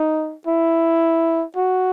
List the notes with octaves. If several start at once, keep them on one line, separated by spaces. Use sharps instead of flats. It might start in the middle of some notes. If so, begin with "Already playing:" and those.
Already playing: D#4
E4
F#4